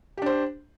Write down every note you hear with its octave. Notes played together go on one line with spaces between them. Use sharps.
D4 G4 C5